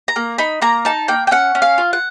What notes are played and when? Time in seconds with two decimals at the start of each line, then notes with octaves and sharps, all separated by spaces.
0.08 A#5
0.16 A#3
0.38 D#4 B5
0.62 A#3 A#5
0.85 D#4 A5
1.08 A#3 G5
1.27 G5
1.31 C#4 F#5
1.55 C#4
1.62 F5
1.78 F4
1.93 F#5